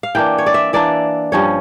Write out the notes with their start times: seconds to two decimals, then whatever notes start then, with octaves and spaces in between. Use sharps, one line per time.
0.03 F5
0.15 E3 A#3 D4 G5
0.38 C#5
0.46 D5
0.54 E5
0.73 E3 A#3 D4 D5
1.32 G2 F3 C#4 C#5